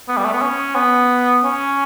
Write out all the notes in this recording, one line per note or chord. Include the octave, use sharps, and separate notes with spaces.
B3
G3
A3
B3
C#4
B3
C#4